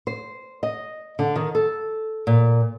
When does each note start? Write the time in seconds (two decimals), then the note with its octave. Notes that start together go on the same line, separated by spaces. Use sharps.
0.07 C5
0.63 D#5
1.19 D3
1.36 D#3
1.55 A4
2.27 A#2